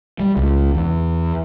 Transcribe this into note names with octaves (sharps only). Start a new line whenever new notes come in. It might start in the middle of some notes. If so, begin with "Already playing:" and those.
G3
C#2
E2